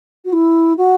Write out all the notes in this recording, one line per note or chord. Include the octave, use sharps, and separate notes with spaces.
F#4
E4
F#4